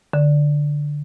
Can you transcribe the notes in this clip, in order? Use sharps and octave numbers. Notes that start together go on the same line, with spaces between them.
D3